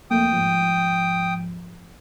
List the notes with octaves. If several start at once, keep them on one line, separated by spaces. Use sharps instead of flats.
F2 A3 A#3 G5 D#6
G#2 F3